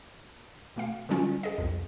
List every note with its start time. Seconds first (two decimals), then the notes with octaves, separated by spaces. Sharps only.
0.76 B2 A3 F5
1.09 D3 F#3 G3 C#4 F4
1.43 G#4 D#5
1.58 C2 F2